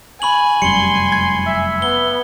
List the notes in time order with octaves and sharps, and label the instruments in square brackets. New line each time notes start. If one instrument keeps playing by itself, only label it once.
[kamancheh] G#5 [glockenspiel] B5 C#6 F#7
[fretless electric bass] F1 F#2 G3 [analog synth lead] C6 [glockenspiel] C#7 G7
[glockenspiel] G#6
[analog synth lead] E5
[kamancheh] B3 [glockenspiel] G7